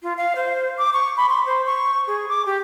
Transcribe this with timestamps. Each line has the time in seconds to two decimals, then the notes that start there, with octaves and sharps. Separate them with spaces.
0.03 F4
0.17 F5
0.35 C5
0.78 D6
0.93 C#6
1.17 B5
1.29 C6
1.46 C5
1.66 C#6
2.07 G#4
2.29 D6
2.46 G4